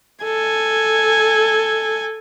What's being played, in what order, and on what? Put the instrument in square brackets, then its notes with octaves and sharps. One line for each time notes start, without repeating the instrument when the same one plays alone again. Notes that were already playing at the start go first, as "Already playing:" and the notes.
[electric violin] A4 [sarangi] G#5